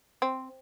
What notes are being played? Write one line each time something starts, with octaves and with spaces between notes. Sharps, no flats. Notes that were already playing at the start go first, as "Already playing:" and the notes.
C4